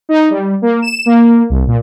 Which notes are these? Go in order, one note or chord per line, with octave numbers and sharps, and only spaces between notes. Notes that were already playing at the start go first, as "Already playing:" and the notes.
D#4
G3
A#3
E7
A#3
C2
A#2